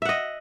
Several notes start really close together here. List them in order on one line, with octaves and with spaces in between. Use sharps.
E5 F#5 D#5